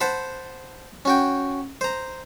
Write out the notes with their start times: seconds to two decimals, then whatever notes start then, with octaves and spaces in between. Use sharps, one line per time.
0.01 C5 F#5 A5 B5
1.05 C#4 F#4 G5
1.81 C5 A#5